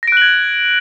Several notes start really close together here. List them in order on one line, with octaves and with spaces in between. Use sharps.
A#6 D7 F#6 F#7 G#6